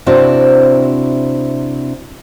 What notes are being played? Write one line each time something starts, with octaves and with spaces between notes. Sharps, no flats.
C3 C4 D4 E4 F#4